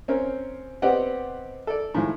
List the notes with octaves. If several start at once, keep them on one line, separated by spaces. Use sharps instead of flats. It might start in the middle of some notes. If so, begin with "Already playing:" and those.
C4 C#4 A#4
B3 C4 G4 D5 D#5 F#5
A4 D5
A2 D#3 F3 G#3